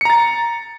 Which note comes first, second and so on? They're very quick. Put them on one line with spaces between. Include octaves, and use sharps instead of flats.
C#7 A#5 A6